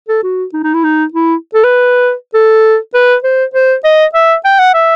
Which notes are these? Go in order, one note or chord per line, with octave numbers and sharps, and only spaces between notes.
A4
F#4
D#4
D#4
E4
D#4
E4
A4
B4
A4
B4
C5
C5
D#5
E5
G5
F#5
E5